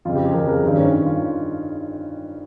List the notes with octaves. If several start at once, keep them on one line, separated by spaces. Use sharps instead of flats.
F2 C#3 F4
G4
G#4
F2 C#3 A#4
A#4
G2 D#3
C#4
G2 D#3
F4